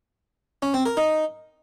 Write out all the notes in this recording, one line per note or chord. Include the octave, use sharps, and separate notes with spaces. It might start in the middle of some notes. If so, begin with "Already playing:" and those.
C#4
C4
A#4
D#4